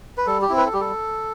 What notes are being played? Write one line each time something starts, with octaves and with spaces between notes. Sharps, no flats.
B4
G3 A4
G4
C4 E4
B4
A4
G3 G4
A4